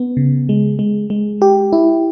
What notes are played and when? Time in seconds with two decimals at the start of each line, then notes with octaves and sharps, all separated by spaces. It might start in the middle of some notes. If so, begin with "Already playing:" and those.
Already playing: B3
0.17 C#3
0.49 G#3
0.79 G#3
1.10 G#3
1.42 G4
1.73 E4